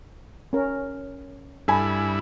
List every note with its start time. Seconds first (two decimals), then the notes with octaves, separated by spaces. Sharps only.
0.53 C#4 A#4
1.68 G2 E4 A4 G#5 B5